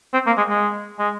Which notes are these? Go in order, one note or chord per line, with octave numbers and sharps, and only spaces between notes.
C4
A#3
G#3
G#3
G#3